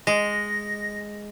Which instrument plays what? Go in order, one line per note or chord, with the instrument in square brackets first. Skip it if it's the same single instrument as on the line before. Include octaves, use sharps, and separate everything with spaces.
[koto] G#3 [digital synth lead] A#6